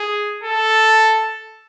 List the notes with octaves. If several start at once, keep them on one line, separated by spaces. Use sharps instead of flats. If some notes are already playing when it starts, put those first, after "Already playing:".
Already playing: G#4
A4